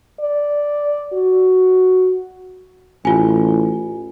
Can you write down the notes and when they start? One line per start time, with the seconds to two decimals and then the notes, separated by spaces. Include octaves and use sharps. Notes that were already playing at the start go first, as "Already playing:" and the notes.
0.20 D5
1.13 F#4
3.05 A1 F4 G#5